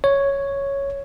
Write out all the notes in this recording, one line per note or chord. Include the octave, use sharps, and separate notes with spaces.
C#5